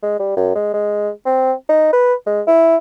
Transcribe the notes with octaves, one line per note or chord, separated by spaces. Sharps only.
G#3
G3
F#2
G#3
G#3
C4
D#4
B4
G#3
E4